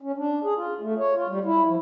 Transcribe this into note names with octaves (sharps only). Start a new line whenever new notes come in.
C#4
D4
G#4
F4
A3
C#5
F4
G3
E4
F3